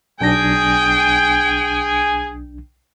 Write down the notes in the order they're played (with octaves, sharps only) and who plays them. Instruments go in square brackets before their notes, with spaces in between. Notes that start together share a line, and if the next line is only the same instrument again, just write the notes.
[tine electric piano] B1 D4 A#6 [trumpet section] G#4 G#5 [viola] G5